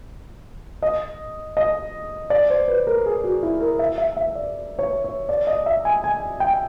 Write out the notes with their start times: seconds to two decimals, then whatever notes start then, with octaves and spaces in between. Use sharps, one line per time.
0.82 D#5
1.57 D#5
2.30 D5
2.50 C5
2.68 B4
2.87 A#4
3.06 G#4
3.24 F#4
3.43 E4
3.61 A#4
3.79 E5
3.98 E5
4.17 E5
4.35 D5
4.79 C#5
5.04 C#5
5.29 D5
5.47 D#5
5.66 E5
5.85 G#5
6.04 G#5
6.40 G5